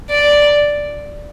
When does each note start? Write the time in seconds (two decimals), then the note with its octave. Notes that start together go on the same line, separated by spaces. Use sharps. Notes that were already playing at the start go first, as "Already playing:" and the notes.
0.10 D5